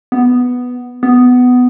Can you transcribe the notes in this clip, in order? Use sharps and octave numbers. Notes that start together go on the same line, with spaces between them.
B3
B3